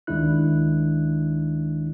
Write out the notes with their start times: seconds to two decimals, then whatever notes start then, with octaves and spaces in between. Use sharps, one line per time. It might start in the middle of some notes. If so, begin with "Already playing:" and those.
0.07 D2 D#3 G#3 D4 E4 F#6